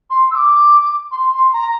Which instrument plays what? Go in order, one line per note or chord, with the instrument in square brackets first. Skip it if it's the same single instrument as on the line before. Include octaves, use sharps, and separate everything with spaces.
[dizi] C6
E6
D6
C6
C6
A#5